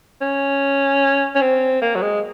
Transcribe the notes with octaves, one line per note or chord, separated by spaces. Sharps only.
C#4
C#4
C4
A#3
F#3
G#3